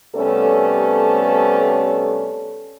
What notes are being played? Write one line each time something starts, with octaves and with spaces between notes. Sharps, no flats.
C3 G3 A3 B3 C#4 A4